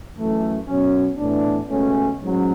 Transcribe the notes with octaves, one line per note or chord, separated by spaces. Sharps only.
F#2 E3 A3
B2 F#3 C#4
A2 E3 B3 D4
C#2 B2 A3 C#4
A1 G#2 F#3 C#4